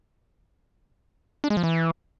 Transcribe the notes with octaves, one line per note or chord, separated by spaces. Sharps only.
D4
G#3
F3
E3